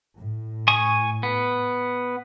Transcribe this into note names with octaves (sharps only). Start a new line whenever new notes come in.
A2
G#5 C#6 D#6
B3